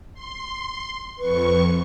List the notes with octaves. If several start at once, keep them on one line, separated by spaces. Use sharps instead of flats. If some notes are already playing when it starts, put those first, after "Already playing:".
C6
F2 B4 C#6